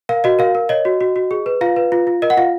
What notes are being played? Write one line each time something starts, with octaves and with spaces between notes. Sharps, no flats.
A#4 F5
F#4 D#5
A#4 F5
A#4
C#5 D#5
F#4
F#4
F#4
G#4
B4
F4 F5
B4
F4
F4
A#4 D#5
F#5
F4 F5